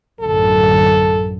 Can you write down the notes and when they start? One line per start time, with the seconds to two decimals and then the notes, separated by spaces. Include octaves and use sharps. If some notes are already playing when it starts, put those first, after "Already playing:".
0.21 A1 F#2 D3 A4